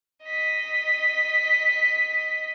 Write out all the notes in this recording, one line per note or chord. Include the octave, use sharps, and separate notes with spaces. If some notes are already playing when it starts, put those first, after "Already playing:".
D#5 B6